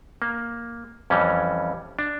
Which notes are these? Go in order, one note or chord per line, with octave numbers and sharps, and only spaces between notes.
A#3
F2 E3 G3 C#4
D4